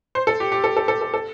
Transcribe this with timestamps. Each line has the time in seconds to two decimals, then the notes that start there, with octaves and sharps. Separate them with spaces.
0.15 C5
0.27 A4
0.40 G4
0.52 G4
0.64 A4
0.77 A4
0.88 A4
1.01 A4
1.14 A4